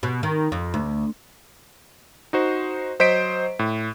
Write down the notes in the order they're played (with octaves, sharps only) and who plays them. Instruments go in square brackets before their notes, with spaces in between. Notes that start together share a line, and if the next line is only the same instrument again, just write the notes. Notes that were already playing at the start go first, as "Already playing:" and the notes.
[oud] B2
D#3
F2
D2
[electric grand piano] D#4 F#4 C5
F#3 C5 D#5 B6 D7
A2